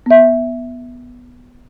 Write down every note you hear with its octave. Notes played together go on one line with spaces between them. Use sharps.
B3 E5